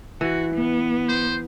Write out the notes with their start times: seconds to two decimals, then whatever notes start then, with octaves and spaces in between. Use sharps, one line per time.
0.21 E3 F#4
0.54 B3
1.09 C5